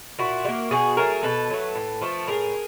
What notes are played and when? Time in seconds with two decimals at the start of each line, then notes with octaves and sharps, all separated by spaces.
0.19 A#2 E4 F#4
0.44 G3
0.48 A#3
0.71 B2 F#4 G#4
0.97 F#3 A3 G#4 A#4
1.23 B2 A4 B4
1.50 F#3 A3
1.75 A2
2.01 F3 A3
2.27 A2 G#4 A#4